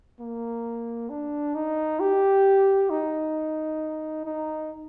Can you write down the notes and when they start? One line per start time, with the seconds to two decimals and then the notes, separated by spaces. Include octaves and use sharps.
0.20 A#3
1.09 D4
1.55 D#4
2.00 G4
2.90 D#4
4.26 D#4